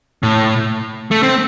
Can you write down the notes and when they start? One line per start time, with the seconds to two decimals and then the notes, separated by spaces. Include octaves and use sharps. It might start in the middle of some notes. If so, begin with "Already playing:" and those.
0.23 A2
1.11 A3
1.23 C4